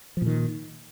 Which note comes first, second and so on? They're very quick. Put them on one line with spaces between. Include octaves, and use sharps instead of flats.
F3 A#2 D#3